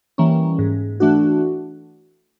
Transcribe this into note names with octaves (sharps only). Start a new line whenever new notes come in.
E3 G3 A#3 C#4
G#2
E3 A3 D4 F#4